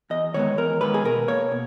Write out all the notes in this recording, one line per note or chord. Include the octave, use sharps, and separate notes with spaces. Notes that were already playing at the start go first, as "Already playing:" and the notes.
E2 D#5
D#3 G#3 B3 C#5
E2 A#4
D#3 G#3 B3 B4
G#4
B2 A#4
A#3 C#5
B2